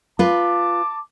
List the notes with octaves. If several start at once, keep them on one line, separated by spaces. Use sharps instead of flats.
F4 B4 A5 D6